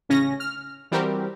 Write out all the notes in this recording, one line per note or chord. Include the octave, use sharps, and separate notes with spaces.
A1 C#3 C#4 A#6
F6
E3 G3 C4 F#4 G4 A#4